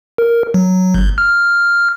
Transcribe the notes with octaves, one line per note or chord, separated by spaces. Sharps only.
A#4
F#3
G1
F6